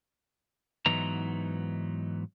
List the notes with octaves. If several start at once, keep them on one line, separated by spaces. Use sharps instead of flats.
G#2 E3 F#3 B3 D#4 A#5